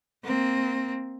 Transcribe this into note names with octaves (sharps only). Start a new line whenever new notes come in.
A#3 C4